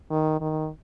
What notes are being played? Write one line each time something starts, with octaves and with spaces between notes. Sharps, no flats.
D#3
D#3